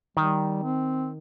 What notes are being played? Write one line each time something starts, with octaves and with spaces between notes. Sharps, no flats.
D#3 G3
C4